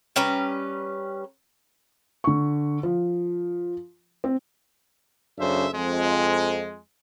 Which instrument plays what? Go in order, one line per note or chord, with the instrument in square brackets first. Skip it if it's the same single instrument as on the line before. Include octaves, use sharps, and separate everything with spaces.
[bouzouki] G3 C#4 B4 A#5
[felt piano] D3 C#6
F3
C4
[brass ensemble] F#2 C#3 D4 A4 C5 E5
F2 G#3